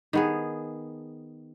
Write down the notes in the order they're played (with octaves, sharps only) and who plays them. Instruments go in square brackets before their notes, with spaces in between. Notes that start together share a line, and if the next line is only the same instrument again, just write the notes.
[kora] D#3 B3 G#4